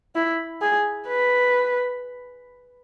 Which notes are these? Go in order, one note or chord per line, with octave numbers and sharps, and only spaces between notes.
E4
G#4
B4